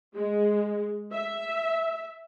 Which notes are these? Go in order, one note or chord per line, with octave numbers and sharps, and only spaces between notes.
G#3
E5